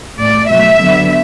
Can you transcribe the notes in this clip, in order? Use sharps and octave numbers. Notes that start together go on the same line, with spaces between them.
A2 A3 D5
B2 F#3 A3 E5
D3 F#3 B3